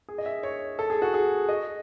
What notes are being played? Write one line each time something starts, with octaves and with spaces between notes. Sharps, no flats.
G#4
D#5
E5
C#5
A4
G#4
F#4
G#4
D#5